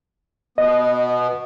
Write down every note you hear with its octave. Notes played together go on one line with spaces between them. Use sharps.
B2 B3 D#5